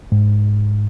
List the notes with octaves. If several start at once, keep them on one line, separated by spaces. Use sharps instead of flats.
G#2